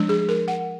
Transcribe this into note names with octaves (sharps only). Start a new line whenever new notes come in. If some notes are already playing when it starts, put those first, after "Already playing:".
Already playing: F3 G#3 D4
G#4
A#4
F#5